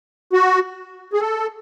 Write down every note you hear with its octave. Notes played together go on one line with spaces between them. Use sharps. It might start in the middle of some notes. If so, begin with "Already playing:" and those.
F#4
G#4
A4